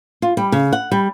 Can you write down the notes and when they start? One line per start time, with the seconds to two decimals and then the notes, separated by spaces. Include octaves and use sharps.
0.22 F4
0.37 G3
0.52 C#3
0.73 F#5
0.92 G3